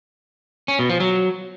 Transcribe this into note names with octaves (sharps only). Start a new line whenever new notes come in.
C#4
B2
F3
F#3